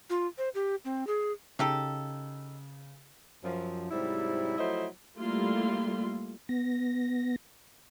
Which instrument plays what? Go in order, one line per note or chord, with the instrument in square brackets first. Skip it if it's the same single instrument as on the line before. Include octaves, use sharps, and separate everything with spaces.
[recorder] F4
C5
G4
C4
G#4
[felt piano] C#3 [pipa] D#4 G4 A4
[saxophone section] F#2 F3
G#2 C3 F#3 G3 E4
F3 F#3 A3 E4 C5 D#5
[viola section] G3 A3 A#3 E4 F4 C6
[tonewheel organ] B3 A#6